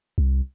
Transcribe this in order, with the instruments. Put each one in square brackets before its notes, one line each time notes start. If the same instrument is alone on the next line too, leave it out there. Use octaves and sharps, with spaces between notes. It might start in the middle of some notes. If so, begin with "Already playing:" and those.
[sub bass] C2